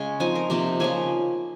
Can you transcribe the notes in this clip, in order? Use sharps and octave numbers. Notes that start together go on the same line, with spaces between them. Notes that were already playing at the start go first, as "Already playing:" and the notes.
Already playing: C#3 G#3 C#4
F3 C4 D#4 G#5
A#4
C3 F3 A#3 D#4
C#3 F3 A#3 G#5